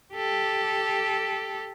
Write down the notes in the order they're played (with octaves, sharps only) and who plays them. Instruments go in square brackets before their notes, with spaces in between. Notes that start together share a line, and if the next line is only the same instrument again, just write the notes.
[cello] G4 A4